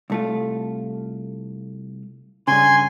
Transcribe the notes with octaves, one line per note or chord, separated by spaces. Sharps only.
C2 A3 F4
G2 C#3 G#5 C6